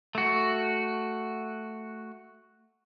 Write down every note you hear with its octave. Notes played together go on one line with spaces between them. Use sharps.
A3 F#4